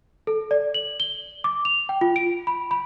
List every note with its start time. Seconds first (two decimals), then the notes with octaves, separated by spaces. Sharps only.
0.27 A4
0.51 D5
0.74 F#7
1.00 G7
1.44 D6
1.65 F7
1.89 G5
2.01 F4
2.16 D7
2.47 B5
2.71 B5